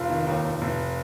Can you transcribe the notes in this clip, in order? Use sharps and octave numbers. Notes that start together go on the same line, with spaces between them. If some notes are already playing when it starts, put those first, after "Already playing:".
Already playing: F1 F4
D#3
D#2
F1
F1